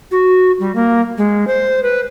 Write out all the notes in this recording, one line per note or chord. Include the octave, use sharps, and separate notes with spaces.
F#4
G3
A#3
G#3
C5
B4